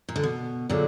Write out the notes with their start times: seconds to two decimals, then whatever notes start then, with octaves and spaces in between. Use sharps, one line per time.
0.09 A#2
0.16 D3
0.23 B2
0.69 A#2 D3 F#3 D4 F4 G#4 D5